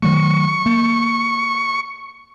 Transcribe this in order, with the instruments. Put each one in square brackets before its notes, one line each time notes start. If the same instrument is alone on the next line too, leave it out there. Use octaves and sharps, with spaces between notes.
[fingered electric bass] D#3 F#3 A3 [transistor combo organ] C#6
[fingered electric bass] A#3